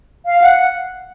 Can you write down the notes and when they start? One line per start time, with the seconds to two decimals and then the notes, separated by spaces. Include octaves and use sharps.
0.26 F5
0.42 F#5